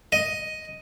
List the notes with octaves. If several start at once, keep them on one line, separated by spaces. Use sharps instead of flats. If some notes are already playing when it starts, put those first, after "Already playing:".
D#5